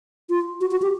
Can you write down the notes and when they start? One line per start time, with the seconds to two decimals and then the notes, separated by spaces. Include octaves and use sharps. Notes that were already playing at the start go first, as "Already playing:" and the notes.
0.29 F4
0.61 F#4
0.71 F#4
0.82 G4